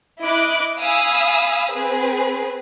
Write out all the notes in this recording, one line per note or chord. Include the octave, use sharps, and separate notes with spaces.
E4 D#5 D6 F#6 D7
F5 G#5 B5 D#6 E6
C4 G#4 B4